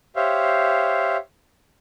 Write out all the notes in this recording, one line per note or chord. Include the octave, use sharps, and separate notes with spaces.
G4 C5 C#5 E5 F5